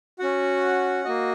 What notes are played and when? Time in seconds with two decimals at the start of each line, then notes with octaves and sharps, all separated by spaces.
0.19 C#4 F#4 F#5
1.04 A#3 F#4 D#5